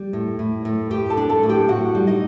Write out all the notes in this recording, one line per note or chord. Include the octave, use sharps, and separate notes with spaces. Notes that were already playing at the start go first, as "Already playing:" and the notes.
Already playing: G3
A2
A2
A2
A2 G4 G5
A4 A5
D4
A4 A5
A2
G4 G5
A2 F#4 F#5
G3
D#4 D#5